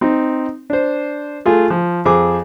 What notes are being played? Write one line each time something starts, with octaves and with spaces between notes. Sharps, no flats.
C4 D#4
D4 C5
A3 F4 G#4
F3
F2 G#4 C5 D6